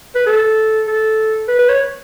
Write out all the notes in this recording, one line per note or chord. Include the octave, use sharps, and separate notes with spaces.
B4
A4
A4
B4
B4
C#5